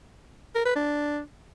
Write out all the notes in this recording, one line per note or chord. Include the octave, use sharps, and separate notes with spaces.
A#4
B4
D4